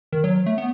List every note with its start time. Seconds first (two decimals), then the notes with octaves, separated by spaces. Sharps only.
0.12 D#3
0.24 F#3
0.46 A3
0.58 B3